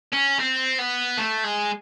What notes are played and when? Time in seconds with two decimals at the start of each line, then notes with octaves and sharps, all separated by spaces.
0.13 C#4
0.39 C4
0.79 B3
1.17 A3
1.44 G#3